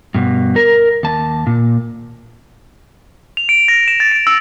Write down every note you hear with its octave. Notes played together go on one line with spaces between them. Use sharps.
G2 B2
A#4
D#2 A5
A#2
F7
D7
A#6
E7
A6
D7
E6